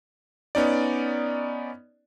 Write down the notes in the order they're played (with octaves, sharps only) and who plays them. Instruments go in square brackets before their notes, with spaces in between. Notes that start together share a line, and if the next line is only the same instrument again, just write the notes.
[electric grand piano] B3 C#4 D#4 D5